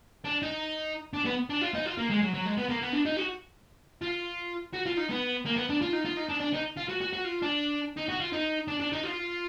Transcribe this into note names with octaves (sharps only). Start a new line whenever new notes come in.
D4
D#4
D4
B3
D4
F4
D#4
F4
A#3
G#3
F#3
F#3
G#3
B3
A#3
B3
D4
D#4
F#4
F4
F#4
F4
D#4
B3
A#3
B3
D4
F4
D#4
F4
D#4
D4
D4
D#4
F4
F#4
F#4
F#4
F4
D4
D#4
F#4
F4
D#4
D4
D4
D#4
F4